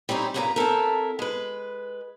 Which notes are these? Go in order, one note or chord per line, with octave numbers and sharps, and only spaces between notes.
G3 C4 C#4 D#4 E4
G2 A#2 C#3 G#4 B4 A#5
C4 E4 A4 A#4
G#3 B4